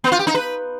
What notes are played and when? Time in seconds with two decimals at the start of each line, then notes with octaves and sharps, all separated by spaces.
0.04 B3
0.12 F4
0.19 G4
0.27 D#4
0.35 B4